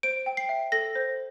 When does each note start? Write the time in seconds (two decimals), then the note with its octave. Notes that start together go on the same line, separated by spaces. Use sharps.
0.03 C5 D7
0.26 G5
0.37 C7
0.49 E5
0.72 A4 A#6
0.95 C5